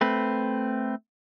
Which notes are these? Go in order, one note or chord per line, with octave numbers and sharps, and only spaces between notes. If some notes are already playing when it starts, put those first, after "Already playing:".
A3 C4 B4